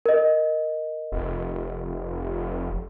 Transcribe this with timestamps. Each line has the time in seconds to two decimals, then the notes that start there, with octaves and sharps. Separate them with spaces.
0.06 A#4 D#5
1.12 F1